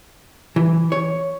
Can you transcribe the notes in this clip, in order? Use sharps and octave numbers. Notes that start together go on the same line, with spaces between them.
E3
C#5